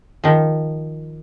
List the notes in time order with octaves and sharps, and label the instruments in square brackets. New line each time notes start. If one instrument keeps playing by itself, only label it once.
[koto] D#3 F3